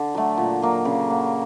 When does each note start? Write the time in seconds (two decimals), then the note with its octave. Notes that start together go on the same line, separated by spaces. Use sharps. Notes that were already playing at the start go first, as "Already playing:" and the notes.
Already playing: D3
0.14 F#3 A3
0.37 A#2
0.62 F#3 A#3
0.85 C#3
1.10 F#3 A#3